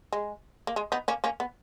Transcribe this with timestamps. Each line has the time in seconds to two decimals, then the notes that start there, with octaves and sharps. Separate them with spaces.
0.13 G#3
0.67 A#3
0.76 G#3
0.92 B3 D#4
1.08 A#3 C#4
1.24 A#3 C#4
1.40 B3